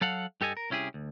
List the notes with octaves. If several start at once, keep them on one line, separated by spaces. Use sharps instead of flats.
F#3 A4 F5 F#5
G2 G4 A4 D#5 G#5
A#4
C2 C#4 E4 G4 G#4
D2